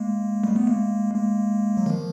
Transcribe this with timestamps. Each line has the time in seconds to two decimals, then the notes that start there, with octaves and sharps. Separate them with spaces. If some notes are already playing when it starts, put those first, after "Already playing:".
Already playing: G#3 A#3
0.44 G3 A3
0.56 A3 B3
0.67 G#3 A#3
1.15 G#3 A#3
1.77 F#3
1.86 D#3 F3